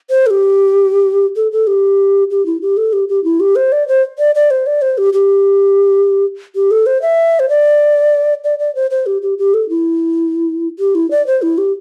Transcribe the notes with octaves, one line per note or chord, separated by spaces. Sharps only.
C5
A4
G4
A4
A4
G4
G4
E4
G4
A4
G4
G4
E4
G4
C5
D5
C5
D5
D5
C5
D5
C5
G4
G4
G4
A4
C5
E5
C5
D5
D5
D5
C5
C5
G4
G4
G4
A4
E4
G4
E4
D5
C5
E4
G4